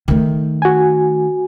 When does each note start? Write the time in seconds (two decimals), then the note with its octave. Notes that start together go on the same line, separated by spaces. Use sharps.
0.08 D#3 A3
0.62 F#4 G#5